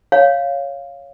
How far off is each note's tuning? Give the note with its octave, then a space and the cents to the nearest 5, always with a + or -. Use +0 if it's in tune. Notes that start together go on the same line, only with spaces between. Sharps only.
C#5 +0 F5 +0